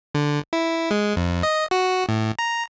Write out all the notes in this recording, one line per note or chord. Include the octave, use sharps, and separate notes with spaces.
D3
E4
G#3
F2
D#5
F#4
A2
A#5